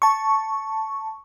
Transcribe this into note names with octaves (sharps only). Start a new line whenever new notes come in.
A5 C#6